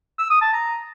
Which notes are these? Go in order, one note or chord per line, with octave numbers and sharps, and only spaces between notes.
E6
D#6
A5
A#5